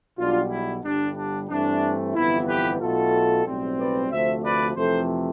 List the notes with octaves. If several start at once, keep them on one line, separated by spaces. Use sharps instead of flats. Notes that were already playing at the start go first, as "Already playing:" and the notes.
B1 B2 G3 D4 F4
E4
G1 G2 D3 G3 D4
D4
G2 E3 A3 C4 D4
G1 F2 E3 B3 E4
G4 B4
B1 B2 A3 F4 A4
B1 A2 G3 C4
B4 D5
D2 C3 F3 A3 C5 E5
B4 D5
F2 C3 E3 A3 A4 C5